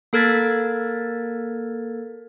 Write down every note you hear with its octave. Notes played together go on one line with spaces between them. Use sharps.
A#3 A4 A#4 G#6 A6 B6